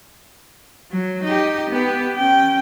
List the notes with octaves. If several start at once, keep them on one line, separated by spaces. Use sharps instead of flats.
F#3
D#4 G4
B3 G4
C#4 G5